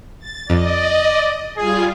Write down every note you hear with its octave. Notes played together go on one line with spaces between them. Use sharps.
A6
F2 D5 D#5
G3 F4 G#4